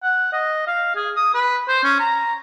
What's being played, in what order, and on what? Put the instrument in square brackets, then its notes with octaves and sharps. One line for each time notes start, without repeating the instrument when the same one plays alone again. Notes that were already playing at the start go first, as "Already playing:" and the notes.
[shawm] F#5
D#5
F5
G#4
D#6
B4
C5
C#4
A#5